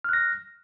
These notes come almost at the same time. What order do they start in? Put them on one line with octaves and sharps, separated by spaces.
F6 F#6 A#6